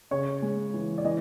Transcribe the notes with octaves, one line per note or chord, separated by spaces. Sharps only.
C#3 C#5
G#3
E3
D5
E3 D#5